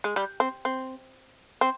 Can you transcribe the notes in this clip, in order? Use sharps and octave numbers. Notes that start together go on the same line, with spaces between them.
G#3
G3
C4
C4
C4